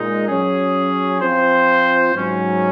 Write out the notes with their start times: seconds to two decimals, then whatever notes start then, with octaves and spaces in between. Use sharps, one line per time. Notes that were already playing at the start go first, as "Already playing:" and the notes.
Already playing: A#2 G#3 D#4
0.28 F#3 C#4 G#4
1.21 F3 C4 F4 C5
2.14 G#2 F#3 C#4